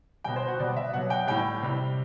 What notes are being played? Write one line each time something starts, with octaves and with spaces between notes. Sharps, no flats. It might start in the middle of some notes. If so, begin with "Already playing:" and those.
B2 G3 G5
C5
F#4
B2 G3 D5
E5
B2 F#3 F#5
G5
A2 G3 G5
C3 G3